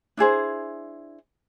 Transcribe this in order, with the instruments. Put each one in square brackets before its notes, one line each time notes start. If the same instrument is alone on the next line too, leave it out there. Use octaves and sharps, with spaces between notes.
[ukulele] D4 E4 G#4 C5